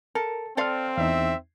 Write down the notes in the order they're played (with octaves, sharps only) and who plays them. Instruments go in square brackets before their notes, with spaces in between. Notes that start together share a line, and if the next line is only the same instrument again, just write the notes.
[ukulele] A4 [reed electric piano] A#4
[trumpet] C4 [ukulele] A4 D5 F5 [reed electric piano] G5 C6 F6
[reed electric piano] E2 D#4 [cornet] E5